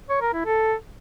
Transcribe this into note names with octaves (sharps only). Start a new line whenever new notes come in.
C#5
A#4
E4
A4